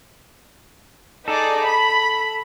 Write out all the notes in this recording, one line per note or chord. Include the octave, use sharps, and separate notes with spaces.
D#4 G#4 A4 D5
B5